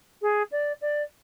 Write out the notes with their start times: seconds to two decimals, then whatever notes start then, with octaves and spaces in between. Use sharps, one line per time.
0.22 G#4
0.52 D5
0.81 D5